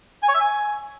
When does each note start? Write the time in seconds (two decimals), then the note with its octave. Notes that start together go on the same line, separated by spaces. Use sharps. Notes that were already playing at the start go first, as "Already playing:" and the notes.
0.22 G#5
0.28 C#5
0.34 E5
0.40 G#5